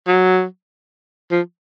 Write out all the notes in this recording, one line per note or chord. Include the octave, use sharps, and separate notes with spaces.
F#3
F3